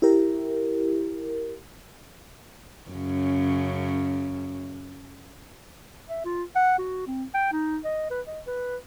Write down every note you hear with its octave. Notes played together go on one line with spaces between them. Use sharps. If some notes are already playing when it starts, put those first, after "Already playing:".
E4 G4 A#4
F#2 C#3
E5
F4
F#5
F#4
C4
G5
D#4
D#5
B4
D#5
B4